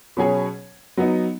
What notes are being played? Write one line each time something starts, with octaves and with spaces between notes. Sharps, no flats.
B2 F#3 C#4 G#4 C#5
F#3 B3 D#4